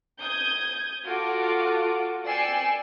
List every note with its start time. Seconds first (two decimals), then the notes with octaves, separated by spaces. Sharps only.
0.20 D#6 G6 G#6
1.05 F4 F#4 A4 D6
2.26 D5 G5 G#5 E6 C7 C#7